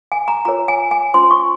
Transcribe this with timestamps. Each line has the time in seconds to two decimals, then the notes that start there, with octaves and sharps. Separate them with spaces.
0.12 G#5
0.28 A#5
0.45 F4 A#4 C#5 A#5
0.68 G#5
0.91 G#5
1.14 C#4 F4 C5 C6
1.31 C#6